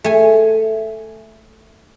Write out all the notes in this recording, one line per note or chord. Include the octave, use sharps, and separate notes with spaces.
A3 G#5